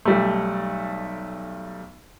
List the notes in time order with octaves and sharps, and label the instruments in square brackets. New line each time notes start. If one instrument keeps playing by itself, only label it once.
[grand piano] B1 G3 A3